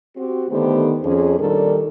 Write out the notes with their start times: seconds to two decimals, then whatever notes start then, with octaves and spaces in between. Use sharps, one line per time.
0.17 C4 F#4 G4
0.50 D3 D#3 A3 B3 G4 C5
1.03 F2 C#4 G#4
1.39 A#2 D#3 G3 D4 A4 A#4